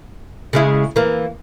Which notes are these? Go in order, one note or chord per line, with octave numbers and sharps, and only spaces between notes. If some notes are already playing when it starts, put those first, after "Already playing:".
C#3 G#3 E4
E3 A#3